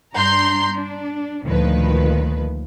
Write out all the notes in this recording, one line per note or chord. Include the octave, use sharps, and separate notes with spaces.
G2 D4 A#5 C6 G6
D4
D2 A#2 D#3 F3 B4